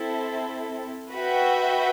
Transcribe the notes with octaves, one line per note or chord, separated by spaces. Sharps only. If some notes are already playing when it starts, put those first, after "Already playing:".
Already playing: C4 E4 A4
F#4 B4 E5 G5